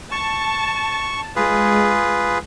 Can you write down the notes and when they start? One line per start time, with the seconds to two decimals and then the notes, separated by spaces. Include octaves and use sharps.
0.12 A5 C#6
1.36 G#3 F4 G#4 B4